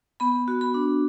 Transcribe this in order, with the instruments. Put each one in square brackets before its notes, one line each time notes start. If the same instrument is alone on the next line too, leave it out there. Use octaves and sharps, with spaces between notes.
[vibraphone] B3 B5
F#4
B5
D4